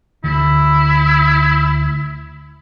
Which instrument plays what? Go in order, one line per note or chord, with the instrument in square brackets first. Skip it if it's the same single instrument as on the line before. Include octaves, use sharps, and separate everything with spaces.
[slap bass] D2 D3 [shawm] E4